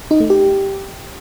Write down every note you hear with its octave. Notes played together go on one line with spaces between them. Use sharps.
D#4
A3
G4